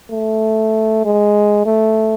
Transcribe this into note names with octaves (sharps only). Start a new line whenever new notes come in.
A3
G#3
A3